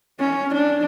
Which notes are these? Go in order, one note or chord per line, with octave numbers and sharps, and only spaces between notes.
C#4
D4